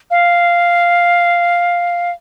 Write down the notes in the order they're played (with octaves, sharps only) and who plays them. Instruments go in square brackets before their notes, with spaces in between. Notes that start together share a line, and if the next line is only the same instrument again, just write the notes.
[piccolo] F5